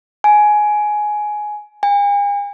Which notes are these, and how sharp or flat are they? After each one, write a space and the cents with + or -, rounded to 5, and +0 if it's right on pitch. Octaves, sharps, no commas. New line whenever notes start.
G#5 +15
G#5 -45